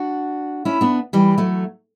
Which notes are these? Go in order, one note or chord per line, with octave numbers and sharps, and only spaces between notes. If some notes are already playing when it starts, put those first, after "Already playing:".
Already playing: D4 F#4
C#4 E4
B3 D4
E3 G3
F#3 A3